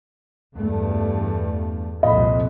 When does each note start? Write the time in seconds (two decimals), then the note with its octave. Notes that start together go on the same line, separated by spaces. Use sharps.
0.55 E2 G2 A3
2.03 C2 F2 A#2 D#5 B5